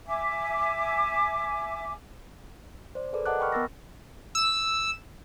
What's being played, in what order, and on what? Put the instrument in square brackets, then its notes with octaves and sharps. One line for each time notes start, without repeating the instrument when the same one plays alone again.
[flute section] E5 G#5 D6
[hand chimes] C5 D5
G#4 A4 B4 D5
A#4 D#5 F#5 A5 D6 F#6
G5 B5 C#6 F6
B3 A#4 E6 A6 A#6
[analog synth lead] E6